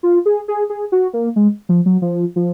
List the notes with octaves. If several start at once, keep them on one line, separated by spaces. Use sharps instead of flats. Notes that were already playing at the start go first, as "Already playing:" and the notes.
F4
G#4
G#4
G#4
F#4
A#3
G#3
F3
F#3
F3
F3